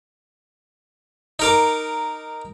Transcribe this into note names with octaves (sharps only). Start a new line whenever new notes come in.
D#4 A#4 D6